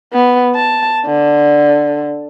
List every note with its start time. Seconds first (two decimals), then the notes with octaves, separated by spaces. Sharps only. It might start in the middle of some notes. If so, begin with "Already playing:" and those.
0.13 B3
0.55 A5
1.06 D3